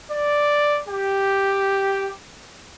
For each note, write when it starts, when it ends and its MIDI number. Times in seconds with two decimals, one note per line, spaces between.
0.12 0.82 74
0.89 2.12 67